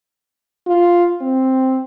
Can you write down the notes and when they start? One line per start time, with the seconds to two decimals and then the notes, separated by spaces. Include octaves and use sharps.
0.67 F4
1.22 C4